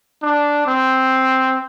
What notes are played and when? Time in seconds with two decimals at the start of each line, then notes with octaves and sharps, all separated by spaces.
0.23 D4
0.66 C4